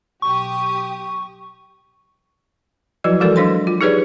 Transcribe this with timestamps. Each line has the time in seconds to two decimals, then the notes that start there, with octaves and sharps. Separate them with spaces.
0.22 B1 G4 C#6 D#6
3.04 F3 F#3 E4 F#4 B4 D5
3.20 E3 G#3 F#4 A4 A#4 D5
3.36 F#3 D4 C5 F5 C6
3.67 F4
3.81 D#4 G4 G#4 B4 C#5 D5